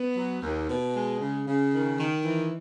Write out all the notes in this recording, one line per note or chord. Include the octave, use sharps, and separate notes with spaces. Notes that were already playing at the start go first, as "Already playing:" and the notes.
Already playing: B3
F#3
D#2
B2
G#3
C#3
C#3
D#3
D#3
E3